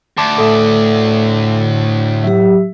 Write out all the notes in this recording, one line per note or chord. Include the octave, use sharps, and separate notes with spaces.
D2 A5 D6
A2 A3 A4 D6
F#3 G4 E5